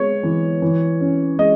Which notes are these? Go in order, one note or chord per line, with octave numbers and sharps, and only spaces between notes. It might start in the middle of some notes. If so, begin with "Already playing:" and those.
Already playing: G#3 B3 C#5
E3
E3
C#4
G#3 D#5